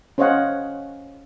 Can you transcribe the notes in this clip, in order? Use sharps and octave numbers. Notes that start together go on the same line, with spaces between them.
C#4 C5 C#5 D#5 F5 F#5